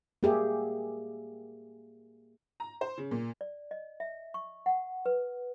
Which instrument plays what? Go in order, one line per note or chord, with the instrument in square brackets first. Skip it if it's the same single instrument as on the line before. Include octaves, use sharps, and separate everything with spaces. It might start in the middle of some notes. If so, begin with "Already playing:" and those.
[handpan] A#3 G4 G#4 E5
[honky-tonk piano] A#5
C5
C#3
A#2
[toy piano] D5
D#5
E5
C#6
F#5
B4